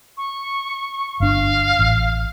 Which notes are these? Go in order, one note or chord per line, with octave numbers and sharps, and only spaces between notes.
C#6
G1 D4 F5
A1